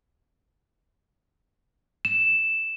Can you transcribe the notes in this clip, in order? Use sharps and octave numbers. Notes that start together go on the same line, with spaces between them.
E7